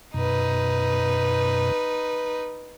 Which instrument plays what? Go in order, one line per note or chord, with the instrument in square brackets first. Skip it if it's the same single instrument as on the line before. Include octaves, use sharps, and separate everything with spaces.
[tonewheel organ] F#2 B2 [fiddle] D#4 B4